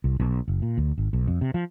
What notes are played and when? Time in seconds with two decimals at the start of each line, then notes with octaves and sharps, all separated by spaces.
0.04 C2
0.20 B1
0.48 F#1
0.62 A#2
0.78 D2
0.98 G#1
1.13 B1
1.27 F2
1.41 C3
1.54 F3